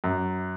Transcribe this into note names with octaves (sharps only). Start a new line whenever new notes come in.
F#2